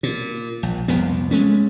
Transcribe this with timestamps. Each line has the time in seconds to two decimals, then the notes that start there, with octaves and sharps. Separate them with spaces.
0.03 A#2
0.63 A#1
0.88 C2 F2 F3 B3
1.31 G#3 A3 C#4